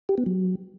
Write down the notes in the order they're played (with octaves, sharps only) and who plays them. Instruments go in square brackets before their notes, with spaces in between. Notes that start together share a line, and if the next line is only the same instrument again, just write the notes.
[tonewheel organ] G4
B3
F#3